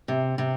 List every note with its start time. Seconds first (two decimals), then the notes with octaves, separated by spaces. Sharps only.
0.08 C3
0.38 C3